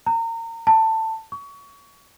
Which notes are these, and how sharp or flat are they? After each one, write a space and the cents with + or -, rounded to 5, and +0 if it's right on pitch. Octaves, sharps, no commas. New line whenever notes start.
A#5 -30
A5 +15
C#6 +25